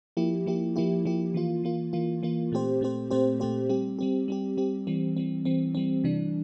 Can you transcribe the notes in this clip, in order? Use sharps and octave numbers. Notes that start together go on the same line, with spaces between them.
F3 A#3 E4 G4
F3 A#3 E4 G4
F3 A#3 E4 G4
F3 A#3 E4 G4
E3 A#3 F4
E3 A#3 F4
E3 A#3 F4
E3 A#3 F4
A#2 A3 C4 G4 C5
A#2 A3 C4 G4 C5
A#2 A3 C4 G4 C5
A#2 A3 C4 G4 C5
G3 C4 G4
G3 C4 G4
G3 C4 G4
G3 C4 G4
E3 G3 C4
E3 G3 C4
E3 G3 C4
E3 G3 C4
C3 E3 G3 D4